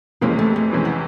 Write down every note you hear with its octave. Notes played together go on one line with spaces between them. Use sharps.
F2 C3 E3 G#3 A#3 C#4
A3
A3
F2 C3 E3 G#3 C#4
B3